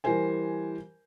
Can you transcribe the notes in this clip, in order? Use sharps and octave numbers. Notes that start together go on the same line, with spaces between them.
E3 G3 A#4 C5 G#5